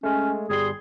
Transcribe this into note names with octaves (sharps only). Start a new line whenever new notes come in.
G#3 A3 C#4
G1 G3 G#4 C6